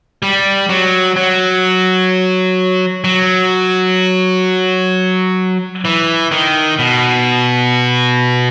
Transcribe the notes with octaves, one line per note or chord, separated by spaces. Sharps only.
G3
F#3
F#3
F#3
E3
D#3
B2